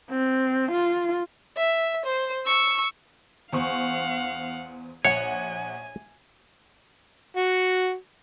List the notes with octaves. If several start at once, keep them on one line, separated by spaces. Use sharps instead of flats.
C4
F4
E5
C5
C#6 E6
E2 C5 F5 F#5 C#6
A#1 C#5 F#5 G#5
F#4